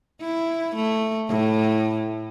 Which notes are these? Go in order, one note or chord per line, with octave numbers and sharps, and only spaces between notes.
E4
A3
A2